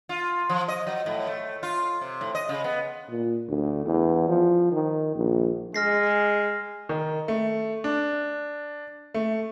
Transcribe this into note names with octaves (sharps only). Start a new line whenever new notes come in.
F4
F3
D#5
F#3
A2
A3
F4
C3
A2
D#5
C#3
B3
A#2
D2
E2
F3
D#3
A#1
G#3 F6 A#6 C7
D#3
A3
D4
A3